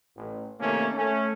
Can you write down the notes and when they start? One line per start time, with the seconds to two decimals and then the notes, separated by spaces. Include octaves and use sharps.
0.16 A1
0.59 C3 D#3 A3 A#3 C#4
0.94 A3 C#4